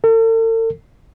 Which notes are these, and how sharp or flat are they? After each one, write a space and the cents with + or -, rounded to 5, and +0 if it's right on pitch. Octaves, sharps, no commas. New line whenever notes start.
A4 +45